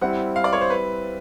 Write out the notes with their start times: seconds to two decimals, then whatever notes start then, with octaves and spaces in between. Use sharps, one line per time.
0.01 G3 C4 E4 F#5
0.36 F5
0.44 D5
0.53 C#5
0.61 C5
0.70 B4